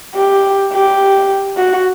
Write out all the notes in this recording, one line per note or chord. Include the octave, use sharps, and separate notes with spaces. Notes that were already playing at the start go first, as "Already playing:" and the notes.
G4
G4
F#4